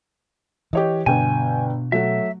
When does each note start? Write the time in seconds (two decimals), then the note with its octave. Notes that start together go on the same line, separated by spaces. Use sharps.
0.73 E3 G4 C#5 D#5
1.06 G1 B2 G5 G#5
1.92 F#3 A3 F#4 E5